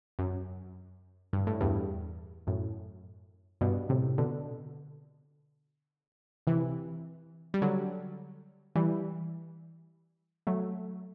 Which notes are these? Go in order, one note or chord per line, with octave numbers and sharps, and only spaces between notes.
F#2
G2
A2
E2 G2
F#2 A2
G2 B2
A2 C3
B2 D3
C3 E3
G3
D3 F#3
E3 G3
F#3 A3